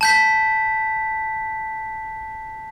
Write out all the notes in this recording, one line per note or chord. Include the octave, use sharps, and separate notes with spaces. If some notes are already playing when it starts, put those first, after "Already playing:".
A5 G6 B6